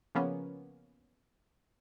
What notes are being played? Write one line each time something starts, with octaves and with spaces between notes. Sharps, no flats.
C#3 F3 A#3 B3 C#4